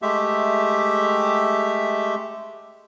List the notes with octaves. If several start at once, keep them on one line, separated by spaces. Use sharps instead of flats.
G#3 A3 G4 E5